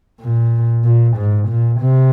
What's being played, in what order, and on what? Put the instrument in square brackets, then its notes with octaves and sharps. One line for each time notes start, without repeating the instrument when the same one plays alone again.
[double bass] A#2
A#2
G#2
A#2
C3